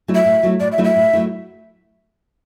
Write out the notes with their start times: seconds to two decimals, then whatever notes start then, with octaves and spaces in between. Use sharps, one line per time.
0.08 F#3 A3 E4
0.15 E5
0.25 A2
0.43 F#3 A3 E4
0.60 A2 D5
0.72 E5
0.78 F#3 A3 E4
0.84 E5
0.96 A2
1.13 F#3 A3 E4